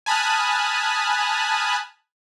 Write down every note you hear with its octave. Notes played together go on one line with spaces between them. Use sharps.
G#5 A5 B5 D#6 F6 F#6